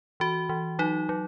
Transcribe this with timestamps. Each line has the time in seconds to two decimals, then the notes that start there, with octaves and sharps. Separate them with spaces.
0.20 E3 F#4
0.49 E3
0.79 F#3 D#4
1.09 F#3